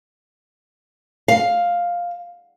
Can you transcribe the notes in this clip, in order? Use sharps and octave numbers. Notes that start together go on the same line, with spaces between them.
F5